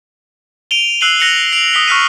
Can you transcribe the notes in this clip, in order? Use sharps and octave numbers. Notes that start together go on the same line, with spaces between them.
D7 D#7 F7 G7
E6 F#6 C7 D#7 F#7 G7
F#6 A#6 C#7 F7 F#7
C7 D7 F7
D#6 B6 G7
C#6 F6 F#6 B6 D#7